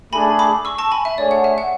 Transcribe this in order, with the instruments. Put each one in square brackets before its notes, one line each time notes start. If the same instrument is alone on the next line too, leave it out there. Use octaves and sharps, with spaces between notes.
[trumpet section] A3 D4 G#4 [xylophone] G#5 B5
[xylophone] B5 D6
C#6 E6
A5 C#6
G#5 B5
E5
[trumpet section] A3 D4 G#4 C#5 [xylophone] D5
[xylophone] F#5
E5
F#5